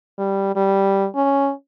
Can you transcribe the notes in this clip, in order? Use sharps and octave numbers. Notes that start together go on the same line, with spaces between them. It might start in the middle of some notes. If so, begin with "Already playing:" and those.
G3
G3
C#4